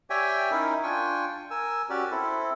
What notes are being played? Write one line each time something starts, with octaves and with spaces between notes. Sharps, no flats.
G4 C#5 D5 E5 G5 G#5
C#4 D#4 E4 A#4
D4 F4 G5 G#5 C#6
A#4 G#5 E6
C#4 F#4 G4 D5
C4 E4 A4